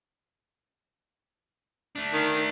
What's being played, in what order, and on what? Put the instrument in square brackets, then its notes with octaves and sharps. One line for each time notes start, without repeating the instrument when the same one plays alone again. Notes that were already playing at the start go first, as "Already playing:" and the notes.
[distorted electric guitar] A3 D4
[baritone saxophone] D#3